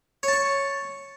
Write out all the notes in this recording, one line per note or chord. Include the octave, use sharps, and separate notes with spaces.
C#5 A5 C#6